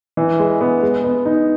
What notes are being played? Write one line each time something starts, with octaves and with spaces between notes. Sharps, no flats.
E3
G#3
B3
G#3
B3
D#4